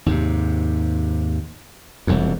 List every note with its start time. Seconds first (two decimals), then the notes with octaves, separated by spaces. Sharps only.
0.06 D#2 G#2 C3
2.07 E1 C2 F2